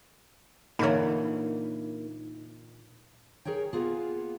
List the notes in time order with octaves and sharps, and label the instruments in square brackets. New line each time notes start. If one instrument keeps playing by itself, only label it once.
[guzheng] A#2 D3 E3 [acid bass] A#3 [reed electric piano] D#4 [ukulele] C#5 B5
[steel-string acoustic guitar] G#4 A#4 C#5 G5
A#3 B3 F4 G#4